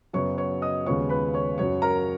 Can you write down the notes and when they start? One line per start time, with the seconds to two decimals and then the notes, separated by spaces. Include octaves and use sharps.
0.13 F#2 C#3 F#3 B3 C#5 C#6
0.38 C#5 C#6
0.62 D#5 D#6
0.85 D#2 C#3 F3 G#3 B3 C#5 C#6
1.09 B4 B5
1.34 C#5 C#6
1.58 F#2 C#3 F#3 C#5 C#6
1.82 A#4 A#5